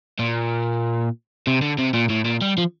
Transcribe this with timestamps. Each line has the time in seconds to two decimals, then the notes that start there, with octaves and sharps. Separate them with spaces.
0.19 A#2
1.47 C3
1.62 D3
1.78 C3
1.94 A#2
2.10 A2
2.25 A#2
2.42 G3
2.58 F3